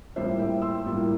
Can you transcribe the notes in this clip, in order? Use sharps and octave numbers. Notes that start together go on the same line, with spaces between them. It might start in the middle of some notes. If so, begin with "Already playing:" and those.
A2 G3 A#3 F4 C5 E5
E5 G5
C6 E6
A2 G3 A#3 F4